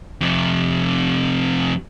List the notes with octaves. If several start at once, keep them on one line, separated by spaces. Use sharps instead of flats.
F2 C3